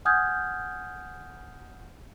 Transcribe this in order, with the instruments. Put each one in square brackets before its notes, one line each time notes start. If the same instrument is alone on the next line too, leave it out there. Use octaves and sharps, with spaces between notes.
[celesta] F#5 G#5 D#6 F6 G6 G#6